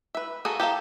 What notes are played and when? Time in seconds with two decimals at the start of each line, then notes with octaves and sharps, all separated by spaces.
0.15 B4 E5
0.45 A#3 F#4 G#4 A4
0.60 G4 A4 A#4 F5